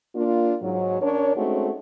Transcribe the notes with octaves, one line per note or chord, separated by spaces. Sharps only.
A#3 D4 F4
G#2 F#3
C#4 D4 A#4 C#5
G#3 A3 C4 C#4 D#4 F#4